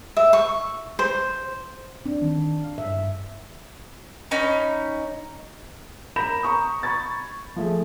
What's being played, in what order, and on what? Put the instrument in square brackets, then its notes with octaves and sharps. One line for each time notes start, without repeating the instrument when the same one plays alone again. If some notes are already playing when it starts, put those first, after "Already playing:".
[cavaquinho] E5
C#6
C5
[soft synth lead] C4 [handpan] D4
[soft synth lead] D#3
F5
[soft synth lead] G2 [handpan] E5
[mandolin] C#4 D#4 B5
[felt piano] A#4 A#5 B5 G6 A#6 E7
A#5 C#6 D#6
B5 C#6 G#6 A6
F3 A3 G#4